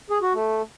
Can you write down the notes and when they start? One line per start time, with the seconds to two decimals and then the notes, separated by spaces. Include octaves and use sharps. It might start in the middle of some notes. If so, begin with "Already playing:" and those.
0.10 G#4
0.22 F#4
0.34 A3